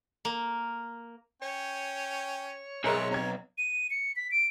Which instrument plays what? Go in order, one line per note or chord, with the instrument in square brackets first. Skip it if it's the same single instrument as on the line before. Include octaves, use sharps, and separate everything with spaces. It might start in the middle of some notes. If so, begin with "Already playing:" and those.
[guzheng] A#3
[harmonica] C#4 G5 [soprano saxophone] C#5
[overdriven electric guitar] B1 [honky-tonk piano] G#4 A#4 D#5 [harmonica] C5 E5 [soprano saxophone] C#5
[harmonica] A#3 A#4 [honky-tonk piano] C4 A#5 G#6
[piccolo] D#7
C#7
B6
D7